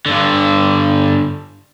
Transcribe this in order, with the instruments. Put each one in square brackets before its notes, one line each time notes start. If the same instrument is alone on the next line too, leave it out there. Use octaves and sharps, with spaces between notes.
[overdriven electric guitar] G2 D3